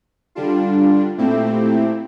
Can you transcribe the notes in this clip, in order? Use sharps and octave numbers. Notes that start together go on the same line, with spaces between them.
D3 G3 D4 F4
A#2 A3 C4 E4 G4